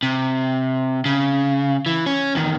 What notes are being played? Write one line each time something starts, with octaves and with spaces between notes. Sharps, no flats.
C3
C#3
E3
C#4
E2 D#3